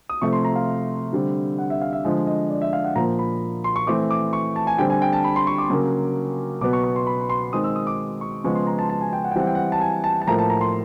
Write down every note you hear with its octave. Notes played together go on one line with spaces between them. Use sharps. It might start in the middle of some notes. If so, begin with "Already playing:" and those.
D#6
C3 F3 A3 C4 C#6
C6
A#5
F5
D3 G3 C4
F#5
E5
F5
E5
D3 F3 G#3 D#5
D#5
D5
E5
F5
F#5
A#2 F3 A#3 A#5
B5
C6
C#6
E3 A3 C4 D6
D6
C#6
A5
G#5
D3 G3 C4 G5
G#5
G5
A5
B5
C6
C#6
D6
C#3 F#3 A#3
B2 F#3 B3 D6
C#6
C#6
C6
B5
B5
C6
D#3 G#3 C4 D#6
E6
D#6
D6
C#6
C#3 F3 G#3 B3 C#6
C6
A#5
A5
A5
G#5
G5
F#5
G5
E3 G3 C4 F#5
G5
F#5
A5
G#5
A5
A5
A2 F3 A#3 A#5
A5
A#5
C6